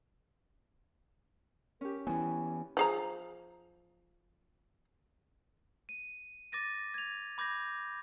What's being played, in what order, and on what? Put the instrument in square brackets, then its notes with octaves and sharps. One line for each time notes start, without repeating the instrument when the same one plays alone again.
[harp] C#4 G4 [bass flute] A#4
[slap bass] E3 B3 [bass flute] E4 [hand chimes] G#5
[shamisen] F3 G#4 A#5
[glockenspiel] D#7
D6 A6 A#6 D#7
G#6 F7
B5 D6 G6 G#6 A#6